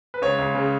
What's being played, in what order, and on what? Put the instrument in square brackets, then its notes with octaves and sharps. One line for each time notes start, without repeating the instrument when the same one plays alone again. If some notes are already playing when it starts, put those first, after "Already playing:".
[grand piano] B4
C#2 C#5
C#2
C#3